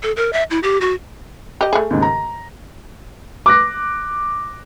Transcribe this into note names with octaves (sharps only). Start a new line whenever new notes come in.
A4
A#4
E5
E4
G4
F#4
G4 D#5
A3 G#4
D#2 G#2 C#3
A#5
D6 F#6 A#6